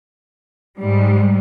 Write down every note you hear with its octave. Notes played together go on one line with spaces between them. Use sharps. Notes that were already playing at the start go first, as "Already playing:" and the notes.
G#2 G3